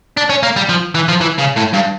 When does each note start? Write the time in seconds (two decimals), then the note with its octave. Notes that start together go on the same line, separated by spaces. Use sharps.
0.17 D4
0.29 C#4
0.43 A#3
0.56 G3
0.69 F3
0.95 E3
1.08 F3
1.21 E3
1.38 C#3
1.56 A2
1.73 G2